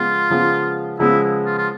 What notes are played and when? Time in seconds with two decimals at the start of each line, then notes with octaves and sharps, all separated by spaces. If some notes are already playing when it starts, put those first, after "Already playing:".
Already playing: C#3 F3 G#3 B3 F4
0.30 C#3 F3 G#3 B3
0.99 C#3 F3 G#3 B3 E4
1.45 F4
1.58 F4